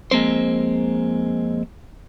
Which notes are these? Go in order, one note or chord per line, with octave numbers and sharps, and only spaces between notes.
F2 G#3 A#3 C4 C5